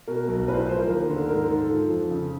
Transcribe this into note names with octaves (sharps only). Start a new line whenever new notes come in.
B2 A#4
B1
A2 B4
C5
B4
F3 C5
A#4
D#2
D3
G#2 A#4
G#2 A4
F3
F2
C#3